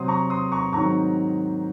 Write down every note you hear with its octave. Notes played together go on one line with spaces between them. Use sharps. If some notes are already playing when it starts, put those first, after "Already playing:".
Already playing: C3 F#3 C4 C6 D#6
A#5 C#6
C6 D#6
A#5 C#6
G#2 D#3 F#3 C4 A#5 C#6